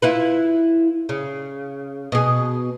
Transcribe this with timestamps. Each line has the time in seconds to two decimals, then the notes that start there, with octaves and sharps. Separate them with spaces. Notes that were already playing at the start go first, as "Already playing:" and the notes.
0.02 E4 F4 B4
1.09 C#3
2.12 B2 G#4